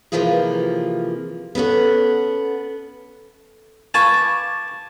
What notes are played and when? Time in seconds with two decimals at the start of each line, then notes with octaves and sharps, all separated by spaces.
0.12 C3 E3 F3 A#3 F4 G#4
1.55 B3 C#4 A4 F#5
3.94 F4 B4 G#5 A5 C#6
4.14 D6